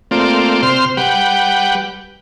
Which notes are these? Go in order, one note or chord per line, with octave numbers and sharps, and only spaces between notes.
A3 A#3 C4 F4 D5
C3 C5 C6 F6
G3 B4 F#5 G5